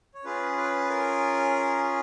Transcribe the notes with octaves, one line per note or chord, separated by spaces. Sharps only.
C#5
C#4 F4 G#4 B4
B4
B4
A#4